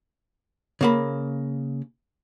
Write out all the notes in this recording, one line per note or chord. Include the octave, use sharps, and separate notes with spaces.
C#3 A#3 B5